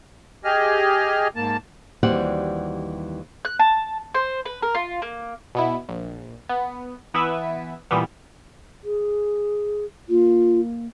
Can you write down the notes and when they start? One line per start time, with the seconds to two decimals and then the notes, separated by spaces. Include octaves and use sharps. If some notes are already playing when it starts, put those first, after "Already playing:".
0.44 G4 G#4 D#5 F6
1.36 G#2 A#3 A5
2.03 D#2 E3 G3 C4 F#4 F#5
3.45 F#6
3.60 A5
4.15 C5
4.46 B4
4.63 A#4
4.75 F4
5.02 A#3
5.55 B2 B3 E4
5.89 A#1
6.49 B3
7.14 E3 B3 E4 B4 E5
7.91 A#2 E3 G3 B3
8.84 G#4
10.09 A#3 F4